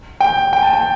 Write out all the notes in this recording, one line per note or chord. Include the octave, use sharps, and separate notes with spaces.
G5
G5
A5
G5